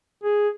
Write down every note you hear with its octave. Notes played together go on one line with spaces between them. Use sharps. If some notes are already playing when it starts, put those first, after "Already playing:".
G#4